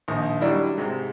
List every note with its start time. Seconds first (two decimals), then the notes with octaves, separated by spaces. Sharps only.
0.08 A#1 D#2 D#4 D#6
0.41 D#3 F#3 G3 D4 E4
0.77 G#2 C3 G#3